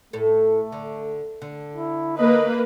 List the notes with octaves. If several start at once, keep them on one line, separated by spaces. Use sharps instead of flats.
A2 A3 A4
D3
D3
E4
A#3 B4 D#5